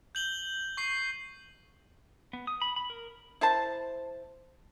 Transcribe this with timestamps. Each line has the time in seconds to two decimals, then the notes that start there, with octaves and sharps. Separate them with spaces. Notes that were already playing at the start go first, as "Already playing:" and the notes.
0.15 G6 F#7 G7
0.77 C#6 C7
2.33 B3
2.47 D#6
2.62 B5
2.76 B5
2.90 A#4
3.41 E4 C5 A5